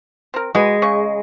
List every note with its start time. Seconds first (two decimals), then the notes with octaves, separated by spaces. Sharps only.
0.34 C4 A#4
0.55 G#3 F#4 G#4 B4
0.82 C#3 C#6